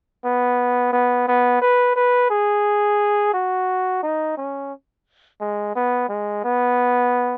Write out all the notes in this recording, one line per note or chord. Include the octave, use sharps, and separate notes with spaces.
B3
B3
B3
B4
B4
G#4
F#4
D#4
C#4
G#3
B3
G#3
B3